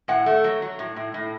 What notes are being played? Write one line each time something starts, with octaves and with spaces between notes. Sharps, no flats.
A2 F#5
A3
F#3
F#3
A2
A2
A2